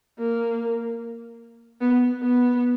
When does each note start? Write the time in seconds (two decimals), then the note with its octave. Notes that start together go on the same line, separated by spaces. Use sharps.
0.19 A#3
1.81 B3
2.22 B3